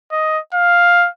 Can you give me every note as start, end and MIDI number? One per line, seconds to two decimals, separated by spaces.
0.12 0.39 75
0.54 1.09 77